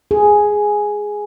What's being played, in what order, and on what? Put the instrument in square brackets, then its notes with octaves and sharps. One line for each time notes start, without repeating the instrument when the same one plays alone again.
[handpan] G#4